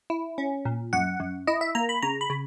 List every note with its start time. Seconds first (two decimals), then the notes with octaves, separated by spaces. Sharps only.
0.10 E4
0.38 C#4
0.65 A#2
0.93 F#2 F#5
1.20 F#2
1.47 E4 D#5
1.61 E5
1.75 A#3 A#5
1.89 B5
2.02 C#3 A#5
2.21 B5
2.30 C#3